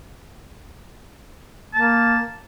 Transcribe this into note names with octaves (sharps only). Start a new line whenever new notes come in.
A#3 A5